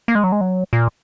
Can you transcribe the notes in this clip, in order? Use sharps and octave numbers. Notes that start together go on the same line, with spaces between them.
A#3
G#3
F#3
G#3
F#3
A#2